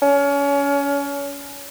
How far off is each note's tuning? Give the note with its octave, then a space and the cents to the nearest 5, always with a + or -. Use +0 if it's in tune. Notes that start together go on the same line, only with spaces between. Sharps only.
C#4 +30